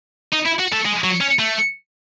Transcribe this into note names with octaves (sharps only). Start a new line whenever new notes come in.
D#4
E4
F#4
A3
G#3
F#3
C#4
A3